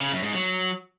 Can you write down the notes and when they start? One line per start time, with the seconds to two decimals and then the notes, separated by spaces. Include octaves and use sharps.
0.01 C#3
0.12 F#2
0.23 G#2
0.34 F#3